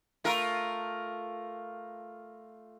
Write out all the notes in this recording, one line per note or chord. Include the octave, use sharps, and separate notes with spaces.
A3 F4 A#4